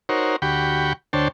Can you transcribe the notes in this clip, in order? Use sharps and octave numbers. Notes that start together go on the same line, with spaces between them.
D#4 F#4 A#4 C5 C#5
D2 F#4 G4 G5 B5 C#6
D2 D4 C5 C#5 G5 A5